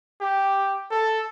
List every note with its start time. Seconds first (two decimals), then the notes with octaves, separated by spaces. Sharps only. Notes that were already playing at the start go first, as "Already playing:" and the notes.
0.21 G4
0.91 A4